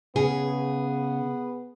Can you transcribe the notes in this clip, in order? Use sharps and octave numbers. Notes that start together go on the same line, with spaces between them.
C#3 B3 G#4